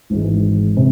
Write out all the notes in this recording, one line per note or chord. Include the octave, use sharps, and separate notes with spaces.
G#1 G#2 E3 G#3
C3